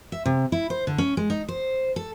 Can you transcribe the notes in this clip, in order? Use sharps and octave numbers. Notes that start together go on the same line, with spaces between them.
E5
C3
E4
C5
D3
C#4
G#3
D#4
C5
A4